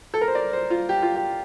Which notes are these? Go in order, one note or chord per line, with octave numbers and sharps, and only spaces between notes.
A4
A#4
C5
D5
C5
F4
G4
F4
G4